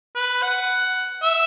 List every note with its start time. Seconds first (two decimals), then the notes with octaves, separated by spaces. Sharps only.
0.15 B4
0.42 F#5
1.22 E5